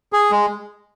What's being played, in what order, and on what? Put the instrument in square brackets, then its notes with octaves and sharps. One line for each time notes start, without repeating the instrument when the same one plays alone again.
[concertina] G#4
G#3